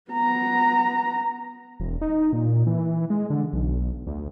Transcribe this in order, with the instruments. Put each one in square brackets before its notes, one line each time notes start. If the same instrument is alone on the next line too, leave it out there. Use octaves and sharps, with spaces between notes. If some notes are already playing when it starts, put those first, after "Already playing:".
[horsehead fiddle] B3 A#5
[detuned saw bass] E1
D#4
A#2
E3
G#3
D3
B1
D2